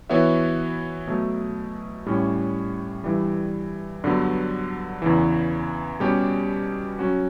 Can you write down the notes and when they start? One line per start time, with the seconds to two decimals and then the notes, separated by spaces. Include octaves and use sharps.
0.09 E3 B3 F#4 C#5 E5
1.07 B2 F#3 A3
2.06 A2 G3 C#4
3.04 G2 E3 G3
4.04 G2 D3 F#3 B3
5.02 E2 C#3 E3
6.00 B2 G3 C#4 G4
6.99 F#3 C#4 F#4